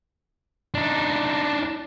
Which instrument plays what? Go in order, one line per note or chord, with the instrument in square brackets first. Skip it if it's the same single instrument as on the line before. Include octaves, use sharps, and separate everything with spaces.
[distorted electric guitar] D4 D#4